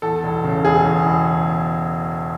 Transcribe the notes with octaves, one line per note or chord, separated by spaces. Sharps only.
E2 A4
E1
C#3
E1 G#4
E2
E1